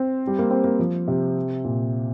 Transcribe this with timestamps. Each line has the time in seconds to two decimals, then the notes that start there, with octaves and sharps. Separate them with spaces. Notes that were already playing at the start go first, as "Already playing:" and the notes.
Already playing: C4
0.27 G3
0.39 A#3
0.51 C4
0.64 A#3
0.79 F3
1.08 C3
1.64 A#2